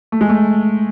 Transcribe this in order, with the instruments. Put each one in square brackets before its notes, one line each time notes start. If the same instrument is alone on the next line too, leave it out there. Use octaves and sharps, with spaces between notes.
[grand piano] A3
G#3
A3